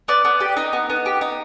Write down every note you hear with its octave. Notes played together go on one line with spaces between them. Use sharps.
B3 D5
B3
G4
D#4
B3
B3
G4
D#4